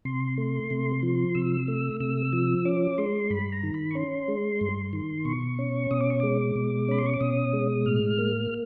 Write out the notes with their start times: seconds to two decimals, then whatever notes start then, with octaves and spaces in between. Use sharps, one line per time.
0.05 C3 C6
0.38 A3
0.70 C3
1.03 F3
1.35 C3 E6
1.68 A3
2.00 C3 E6
2.33 F3
2.65 C#4 D6
2.98 G#3 C6
3.30 G2 B5
3.52 A#5
3.63 D#3
3.74 B5
3.91 C#6
3.95 C#4 C6
4.28 G#3
4.61 G2
4.93 D#3
5.25 B2 C#6
5.59 C#4
5.91 B2 D#6
6.01 D6
6.10 C#6
6.20 G#3 D6
6.56 B2
6.88 C#4 B5
6.98 C6
7.06 C#6
7.14 D6
7.20 B2 D#6
7.53 G#3
7.86 A2 F6
8.19 A#3